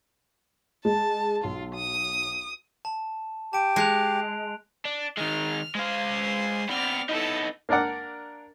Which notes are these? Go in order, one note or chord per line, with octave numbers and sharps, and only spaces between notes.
G#3 A5
B1 F4
D#6
A5
G4 A5 D7
G#3 A5 F#6 F7
D4
D#3 G#3 F6
G#3 C5 F5 G#5
B3 C4 D5 F6
B3 D#4 E4 A4
A#3 D4 A#4 D5 F#5